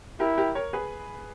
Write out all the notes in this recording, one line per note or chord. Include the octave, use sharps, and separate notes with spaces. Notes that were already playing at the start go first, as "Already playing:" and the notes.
E4 G4 A#4
G4 A#4
A#4 C#5
G#4 B4